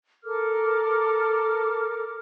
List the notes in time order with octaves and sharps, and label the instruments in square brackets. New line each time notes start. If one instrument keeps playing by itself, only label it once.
[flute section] A4 A#4 D6 F6